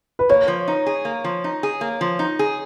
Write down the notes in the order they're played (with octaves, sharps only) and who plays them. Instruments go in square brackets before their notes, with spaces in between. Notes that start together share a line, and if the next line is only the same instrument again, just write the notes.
[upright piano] B4
[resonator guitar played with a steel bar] A#3 [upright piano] C#5
[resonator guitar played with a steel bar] F3
D#4
G#4
A#3
F3
D#4
G#4
A#3
F3
D#4
G#4